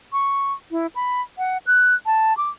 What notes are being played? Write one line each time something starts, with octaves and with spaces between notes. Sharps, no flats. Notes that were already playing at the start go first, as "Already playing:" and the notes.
C#6
E4
B5
F#5
F#6
A5
D6